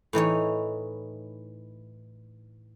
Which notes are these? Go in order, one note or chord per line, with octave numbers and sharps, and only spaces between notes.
A2 E3 D#4 C#5